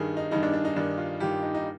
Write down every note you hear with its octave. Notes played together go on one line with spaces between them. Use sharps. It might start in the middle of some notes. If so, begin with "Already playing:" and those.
Already playing: G2 D#3 G#4
D#4
G2 D#3 D#4
D4
D4
D#4
G2 D#3 D4
F4
G2 D#3 G4
D#4
D#4